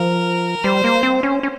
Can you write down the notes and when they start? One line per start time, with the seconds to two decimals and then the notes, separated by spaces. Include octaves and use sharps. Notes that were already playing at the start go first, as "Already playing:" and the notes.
Already playing: F3 A#4
0.64 G3 C5
0.84 A#3
1.03 C4
1.23 C#4
1.43 C#4